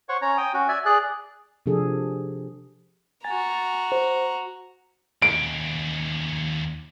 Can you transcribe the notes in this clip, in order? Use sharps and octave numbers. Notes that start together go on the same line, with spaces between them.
C5 C#5 F#5 C#6
C#4 C#5 A#5
G5 D#6
C#4 F#4
D5 E5 G#5
G#4 D5 F#6
C3 F3 D4 G#4 A4
F#4 G#5 A#5 A6
C5
D#2 C#4 D7